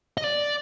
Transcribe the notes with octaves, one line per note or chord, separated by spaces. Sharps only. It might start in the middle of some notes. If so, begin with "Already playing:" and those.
D#5
D5